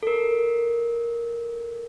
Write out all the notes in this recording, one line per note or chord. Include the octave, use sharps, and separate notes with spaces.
A4 A#4